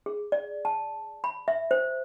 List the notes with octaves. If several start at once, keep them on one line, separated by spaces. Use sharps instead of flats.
G#4
D5
A5
B5
E5
C5